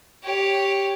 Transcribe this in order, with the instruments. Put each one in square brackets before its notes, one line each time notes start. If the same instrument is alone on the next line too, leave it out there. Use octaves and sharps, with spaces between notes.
[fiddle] G4 C#5